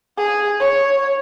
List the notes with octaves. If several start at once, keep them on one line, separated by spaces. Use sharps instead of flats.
G#4
C#5